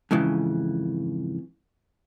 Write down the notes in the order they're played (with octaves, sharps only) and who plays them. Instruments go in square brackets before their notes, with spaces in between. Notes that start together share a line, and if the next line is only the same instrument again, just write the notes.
[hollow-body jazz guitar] F2 G#2 C#3 E3